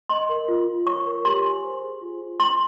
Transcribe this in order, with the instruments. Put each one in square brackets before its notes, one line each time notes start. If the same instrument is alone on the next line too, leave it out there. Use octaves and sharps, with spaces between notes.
[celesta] D#5 [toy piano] C6
[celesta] A#4
F4
F4
[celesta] C#5 [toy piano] C#6
[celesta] A#4
[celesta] G4 [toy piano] C6
[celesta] G#5
C5
G#4
F4
F4
[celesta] G5 [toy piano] C6